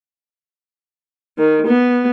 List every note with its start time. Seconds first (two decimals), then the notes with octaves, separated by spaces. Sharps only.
1.38 D#3
1.67 B3